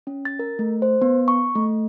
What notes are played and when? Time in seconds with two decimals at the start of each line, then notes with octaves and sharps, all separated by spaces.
0.07 C#4
0.25 A6
0.39 A#4
0.59 A3
0.82 C5
1.02 B3
1.28 C#6
1.55 A3